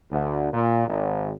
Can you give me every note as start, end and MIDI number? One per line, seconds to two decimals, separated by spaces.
0.10 0.47 38
0.52 0.86 46
0.88 1.31 32